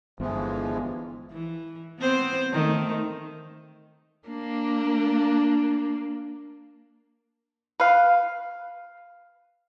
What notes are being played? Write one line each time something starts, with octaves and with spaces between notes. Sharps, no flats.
G1 E3 F3 G#3 B3
E3
B3 C4 C5
D#3 A3
A#3 D4
B4 F5